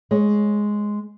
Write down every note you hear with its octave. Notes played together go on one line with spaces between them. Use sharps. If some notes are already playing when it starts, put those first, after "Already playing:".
G#3 C#5